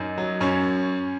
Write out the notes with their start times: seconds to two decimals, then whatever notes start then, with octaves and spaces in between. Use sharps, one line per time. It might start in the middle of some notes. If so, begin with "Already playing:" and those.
Already playing: F#2 D#4 D#5
0.18 F#3
0.41 F#2 C#4 C#5